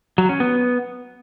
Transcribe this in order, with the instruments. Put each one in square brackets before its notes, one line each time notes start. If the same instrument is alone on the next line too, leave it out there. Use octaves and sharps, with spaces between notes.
[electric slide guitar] F#3
C#4
B3